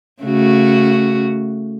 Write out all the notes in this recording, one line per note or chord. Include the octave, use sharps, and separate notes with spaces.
C#3 A3 F#4